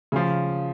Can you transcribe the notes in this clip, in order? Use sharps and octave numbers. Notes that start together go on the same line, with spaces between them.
C#3 F3